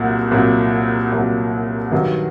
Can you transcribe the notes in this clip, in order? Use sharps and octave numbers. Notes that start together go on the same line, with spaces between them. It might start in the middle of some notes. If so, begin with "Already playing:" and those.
Already playing: C2 A#2 F#3 F#5
C2 A#2 F#3
C2 A#2 F#3
G2 D#3 F#3